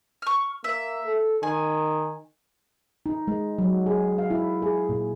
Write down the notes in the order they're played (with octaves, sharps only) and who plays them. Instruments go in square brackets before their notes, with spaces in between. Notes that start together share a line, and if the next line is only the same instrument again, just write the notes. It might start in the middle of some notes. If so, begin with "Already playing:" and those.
[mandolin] C#6 F6
[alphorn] A#3 [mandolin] E5
[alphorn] A4
[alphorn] D#3 [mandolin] G#5
[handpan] D#4
G#3
F#3
G#4
F5
E4
G#4
A#2